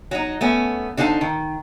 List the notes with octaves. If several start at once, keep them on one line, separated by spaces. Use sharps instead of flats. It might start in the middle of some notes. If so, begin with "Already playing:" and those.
F#3 D#4
A3 B3 C#4
D3 D#4 C5 F5 A5
D#3